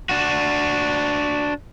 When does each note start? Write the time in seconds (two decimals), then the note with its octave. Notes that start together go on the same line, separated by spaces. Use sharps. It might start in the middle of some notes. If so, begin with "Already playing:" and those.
0.09 D4 F#4